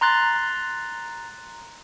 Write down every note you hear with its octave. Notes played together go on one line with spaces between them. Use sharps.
A#5 C6 F#6 A6